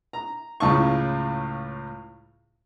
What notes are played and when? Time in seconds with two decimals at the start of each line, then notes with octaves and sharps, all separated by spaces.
0.13 A#5
0.60 C#2 A2 C#3 A5 C#6